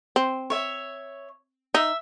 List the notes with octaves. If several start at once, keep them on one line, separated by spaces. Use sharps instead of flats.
C4
C#5 E5
D#4 E5